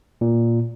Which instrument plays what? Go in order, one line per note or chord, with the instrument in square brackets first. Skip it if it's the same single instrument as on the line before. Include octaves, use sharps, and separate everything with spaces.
[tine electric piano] A#2